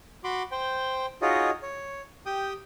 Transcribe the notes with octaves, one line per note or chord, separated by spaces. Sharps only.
F#4 B5 C6 D6
C5 G5
D#4 F4 F#4 G#4 C#5 D#5
C#5
G4 G5 D#6